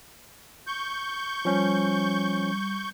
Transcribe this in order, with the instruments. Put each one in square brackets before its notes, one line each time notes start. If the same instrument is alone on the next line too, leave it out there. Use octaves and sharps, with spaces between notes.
[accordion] C#6 G6
[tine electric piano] F3 C#4 [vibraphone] G3